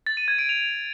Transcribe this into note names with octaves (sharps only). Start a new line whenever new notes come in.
A6
D#7
G#6
D7
F7